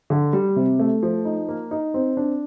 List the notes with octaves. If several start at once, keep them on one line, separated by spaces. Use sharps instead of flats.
D3
G3
C3
A3
F3
D#4
A#3
D#4
C4
D4